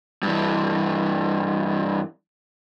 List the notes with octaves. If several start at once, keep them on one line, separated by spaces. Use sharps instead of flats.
G2 E3